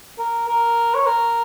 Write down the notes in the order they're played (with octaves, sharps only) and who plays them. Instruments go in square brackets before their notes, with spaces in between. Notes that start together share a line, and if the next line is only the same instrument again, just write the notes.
[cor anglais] A#4
A#4
C#5
A#4